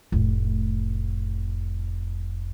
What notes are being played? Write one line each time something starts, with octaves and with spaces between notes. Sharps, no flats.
F1 A2